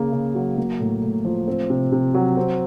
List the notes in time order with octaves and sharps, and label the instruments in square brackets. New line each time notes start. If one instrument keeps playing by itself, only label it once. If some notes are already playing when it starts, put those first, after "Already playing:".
Already playing: [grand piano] C#3 A#3
C#3
F#3
A#3
A2
A2
F3
C4
C3
C3
F#3
C4